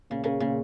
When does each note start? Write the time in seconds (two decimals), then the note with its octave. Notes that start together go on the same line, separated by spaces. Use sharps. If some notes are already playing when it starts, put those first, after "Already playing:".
0.10 A#2 C#3
0.24 C#3 A#4
0.40 A#2 C#3